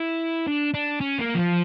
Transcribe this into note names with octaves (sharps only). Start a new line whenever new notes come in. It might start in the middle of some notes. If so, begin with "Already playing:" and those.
Already playing: E4
D4
D4
C#4
A#3
F3